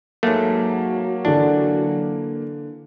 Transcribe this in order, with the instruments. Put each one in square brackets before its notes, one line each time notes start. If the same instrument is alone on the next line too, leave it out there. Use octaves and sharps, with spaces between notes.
[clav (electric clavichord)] G#2 A3 [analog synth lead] F#3 [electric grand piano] A#3
[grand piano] D3 E3 [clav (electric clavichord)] D4